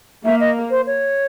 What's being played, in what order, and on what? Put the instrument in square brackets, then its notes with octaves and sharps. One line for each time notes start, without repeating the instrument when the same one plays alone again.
[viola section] A#3 [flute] E5
[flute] D#5
C5
C#5